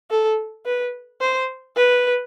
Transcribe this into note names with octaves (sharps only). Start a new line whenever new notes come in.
A4
B4
C5
B4